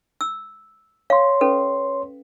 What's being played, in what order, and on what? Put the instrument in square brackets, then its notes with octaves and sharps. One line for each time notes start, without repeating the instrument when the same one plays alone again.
[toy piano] E6
[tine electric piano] C#5 C6 [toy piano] F5
[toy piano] C#4 A4 B4